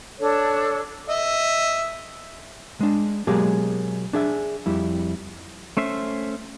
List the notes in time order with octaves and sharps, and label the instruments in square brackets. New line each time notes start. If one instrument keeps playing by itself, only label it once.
[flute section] D4 A4 C#5
[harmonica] D#5 E5
[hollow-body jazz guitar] G#3 D4
B2 F#3 G#3 A#3 G4 G#4
D4 G#4 E5
F2 G3 E4
[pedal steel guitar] A3 C#4 C5 E5